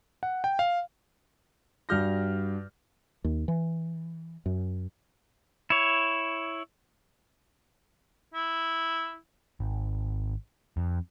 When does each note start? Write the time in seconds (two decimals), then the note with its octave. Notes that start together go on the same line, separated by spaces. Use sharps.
0.23 F#5
0.44 G5
0.59 F5
1.89 G2 G3 F#4 F6 G6 A#6
3.24 D#2
3.48 E3
4.46 F#2
5.70 E4 C#5
8.34 E4
9.60 G#1
10.77 F2